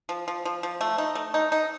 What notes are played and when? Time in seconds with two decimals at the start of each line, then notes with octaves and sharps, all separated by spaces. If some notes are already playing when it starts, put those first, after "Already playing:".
0.09 F3
0.28 F3
0.45 F3
0.63 F3
0.81 A3
0.98 D#4
1.15 A3
1.34 D#4
1.52 D#4